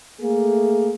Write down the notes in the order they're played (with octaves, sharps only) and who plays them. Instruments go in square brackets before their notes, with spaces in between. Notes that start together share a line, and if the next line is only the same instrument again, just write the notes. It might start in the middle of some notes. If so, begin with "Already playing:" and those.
[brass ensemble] A3 A#3 G#4